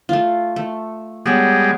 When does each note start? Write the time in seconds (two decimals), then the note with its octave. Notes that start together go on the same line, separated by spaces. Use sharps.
0.09 A3 F4
0.56 A3
1.26 G3 G#3 B3 A4 C#5